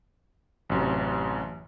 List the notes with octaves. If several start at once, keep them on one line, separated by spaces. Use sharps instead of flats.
A1 F#2 C3